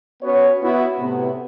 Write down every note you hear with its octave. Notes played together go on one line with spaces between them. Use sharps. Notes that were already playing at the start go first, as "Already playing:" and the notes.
B3 C#4 F#4 C#5
B3 E4 F#4
A2 C3 B3